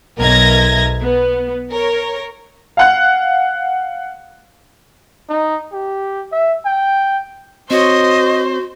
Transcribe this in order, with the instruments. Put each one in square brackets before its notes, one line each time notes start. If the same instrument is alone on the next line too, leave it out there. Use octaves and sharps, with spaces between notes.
[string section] B1 A#4 D#5 E5 G#6 A#6
B3
A#4 C#5
[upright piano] F5 F#5 F#6
[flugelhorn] D#4
G4
E5
G5
[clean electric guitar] C4 C#5 [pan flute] F#4 [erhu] C5 [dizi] D#5